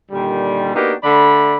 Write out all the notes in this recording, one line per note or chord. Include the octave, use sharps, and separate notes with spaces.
A#2 D3 D#3 G3
A#3 B3 D4 D#4 F#4 G4
D3 A3 D5 B5